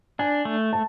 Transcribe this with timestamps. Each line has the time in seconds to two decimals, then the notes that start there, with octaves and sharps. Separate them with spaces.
0.19 D4 G#5
0.45 A3
0.73 A5